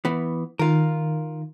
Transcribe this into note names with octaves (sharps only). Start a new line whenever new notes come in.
E3 B3
D#3 F4 A#4